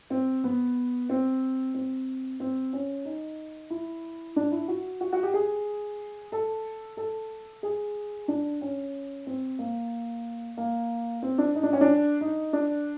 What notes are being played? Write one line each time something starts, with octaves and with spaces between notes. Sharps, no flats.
C4
B3
C4
C4
C4
C#4
D#4
E4
D4
E4
F#4
F#4
F#4
G4
G#4
A4
A4
G#4
D4
C#4
C4
A#3
A#3
C4
D4
D#4
D4
C#4
D4
D#4
D4